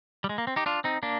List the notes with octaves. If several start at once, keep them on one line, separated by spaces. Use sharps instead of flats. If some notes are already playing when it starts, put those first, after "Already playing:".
G3
G#3
A#3
C4
D#4 G4
D4 F4
C4 D#4
A#3 D4